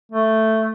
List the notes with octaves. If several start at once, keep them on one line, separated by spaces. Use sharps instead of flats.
A3